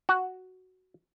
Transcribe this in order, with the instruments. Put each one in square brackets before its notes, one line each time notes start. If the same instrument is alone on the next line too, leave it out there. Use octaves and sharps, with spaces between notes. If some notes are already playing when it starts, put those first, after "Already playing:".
[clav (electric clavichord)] F#4